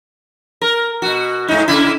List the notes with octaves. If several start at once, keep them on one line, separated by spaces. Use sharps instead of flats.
A#4
B2 F#4
G#2 D#4
C#3 E4